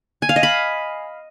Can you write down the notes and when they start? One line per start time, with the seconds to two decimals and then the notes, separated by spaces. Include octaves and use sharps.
0.22 G#5
0.29 F5
0.36 D#5
0.43 B5